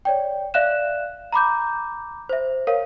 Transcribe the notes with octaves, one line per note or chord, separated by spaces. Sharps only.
C#5 D5 G5
D5 E5 F5 F#6 E7
A#5 B5 D6 G6
C5 E5
A#4 C#5 F5